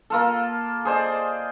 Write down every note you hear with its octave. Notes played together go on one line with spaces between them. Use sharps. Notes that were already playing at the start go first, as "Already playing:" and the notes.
A#3 F4 A4
G#4 C5 D5 D#5